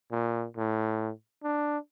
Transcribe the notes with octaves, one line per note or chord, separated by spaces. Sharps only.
A#2
A2
D4